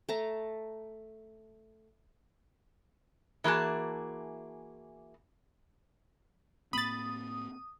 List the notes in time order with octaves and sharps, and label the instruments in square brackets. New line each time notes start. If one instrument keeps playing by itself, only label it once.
[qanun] A3 A5 A#5
[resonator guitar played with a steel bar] E3 A#3 F#4 G#4 A5
[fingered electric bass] A2 A#3 C4 [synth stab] B5 A6 [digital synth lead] D#6